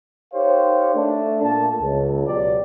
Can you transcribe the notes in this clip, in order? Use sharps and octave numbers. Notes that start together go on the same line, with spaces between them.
D#4 G4 A#4 C5 C#5 F5
A3 D4
A#2 A3 A#3 A5
C#2
B2 F#3 G4 D5